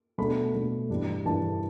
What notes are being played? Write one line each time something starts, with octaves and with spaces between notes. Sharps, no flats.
B2 A3 D4 B5
B2 A3 D4
G2 E3 G3 D4
G2 E3 G3 D4 A5